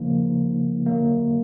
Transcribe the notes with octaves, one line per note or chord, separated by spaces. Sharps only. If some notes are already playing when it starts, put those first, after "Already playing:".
Already playing: C#3 F3 A#3 D#4
D3 F#3 A#3